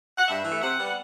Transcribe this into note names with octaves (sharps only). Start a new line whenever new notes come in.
F#5
G2 E5
E3 A3
C3 F#5
G3 B3